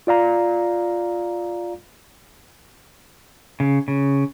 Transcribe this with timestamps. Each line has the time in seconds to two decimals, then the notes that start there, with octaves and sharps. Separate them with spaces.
0.07 F4 D5 F5 A#5
3.60 C#3
3.88 C#3